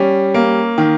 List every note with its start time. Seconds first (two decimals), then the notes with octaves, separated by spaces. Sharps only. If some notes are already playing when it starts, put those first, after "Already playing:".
Already playing: G3 C#4
0.34 A#3
0.78 D#3